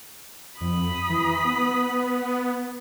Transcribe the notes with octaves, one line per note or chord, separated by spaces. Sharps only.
F2 B5 D#6
E3
B3